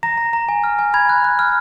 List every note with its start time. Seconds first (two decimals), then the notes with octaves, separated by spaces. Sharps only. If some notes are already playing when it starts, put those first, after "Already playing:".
0.03 A#5 A#6
0.18 A#5
0.33 A#5
0.49 G#5
0.64 F6
0.79 G#5
0.94 B5 G#6
1.09 F#6
1.24 F#6
1.39 F6